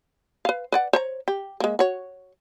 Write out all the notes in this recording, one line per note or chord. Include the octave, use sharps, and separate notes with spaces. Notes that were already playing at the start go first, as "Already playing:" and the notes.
B4 F5
B4 D5 F#5
C5 C#5 A#5
G4
G#3 A#3
F#4 C#5